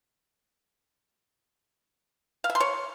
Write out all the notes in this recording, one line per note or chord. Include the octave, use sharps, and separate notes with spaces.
F5
E5
C6
C#5